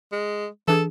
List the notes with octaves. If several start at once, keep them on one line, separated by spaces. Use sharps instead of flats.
G#3
E3 D4 G#4 A4